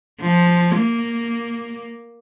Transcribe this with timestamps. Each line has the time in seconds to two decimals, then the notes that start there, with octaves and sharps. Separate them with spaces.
0.21 F3
0.76 A#3